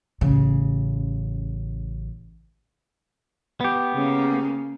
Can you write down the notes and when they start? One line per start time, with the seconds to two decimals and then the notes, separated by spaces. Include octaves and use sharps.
0.21 A1 C#3
3.61 B3 G4
3.94 C#3 A#3